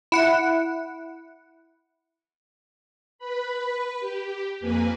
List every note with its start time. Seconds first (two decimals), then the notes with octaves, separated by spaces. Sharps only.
0.12 E4 F#5
3.19 B4 B5
4.00 G4
4.60 F2 A#3 B4 G#5